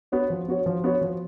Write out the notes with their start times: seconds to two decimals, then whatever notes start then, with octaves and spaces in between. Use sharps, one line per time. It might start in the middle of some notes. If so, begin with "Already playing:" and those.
0.12 B3 F#4 C#5
0.30 F3
0.48 B3 F#4 C#5
0.66 F3
0.84 B3 F#4 C#5
1.01 F3